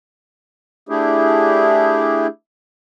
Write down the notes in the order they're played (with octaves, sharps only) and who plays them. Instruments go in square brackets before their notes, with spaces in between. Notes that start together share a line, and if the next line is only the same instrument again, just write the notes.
[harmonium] A3 D4 E4 G4 G#4